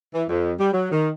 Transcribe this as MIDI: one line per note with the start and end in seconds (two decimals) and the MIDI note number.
0.13 0.23 52
0.29 0.52 41
0.59 0.71 55
0.73 0.90 54
0.92 1.09 51